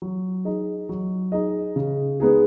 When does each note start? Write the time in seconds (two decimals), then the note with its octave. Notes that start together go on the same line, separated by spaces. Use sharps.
0.02 F#3
0.45 D#4 G#4 D#5
0.89 F#3
1.32 D#4 G#4 D#5
1.76 C#3
2.20 G#3 B3 D#4 G#4